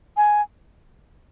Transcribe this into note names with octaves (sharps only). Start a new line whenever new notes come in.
G#5